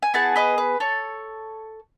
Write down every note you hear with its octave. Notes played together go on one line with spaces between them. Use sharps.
G#5
B3 E4 G#4 F#5 A5
B4 D#5
B4
A4 C#5